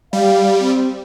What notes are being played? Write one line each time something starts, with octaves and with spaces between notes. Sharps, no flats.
G3 F5
C4